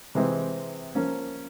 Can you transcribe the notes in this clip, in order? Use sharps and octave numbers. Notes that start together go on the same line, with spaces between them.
C3 E3 G#3 C4
F3 A#3 C#4